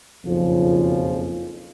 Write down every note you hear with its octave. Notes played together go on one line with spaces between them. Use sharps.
F#1 B1 F2 C#3 F3